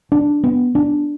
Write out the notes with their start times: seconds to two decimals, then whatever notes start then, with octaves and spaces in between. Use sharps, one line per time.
0.12 D4
0.44 B3
0.75 D4